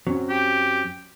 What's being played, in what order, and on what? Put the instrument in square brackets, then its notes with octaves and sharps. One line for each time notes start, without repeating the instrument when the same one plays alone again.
[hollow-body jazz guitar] F#2 F#3 [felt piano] C4 C#4
[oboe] G4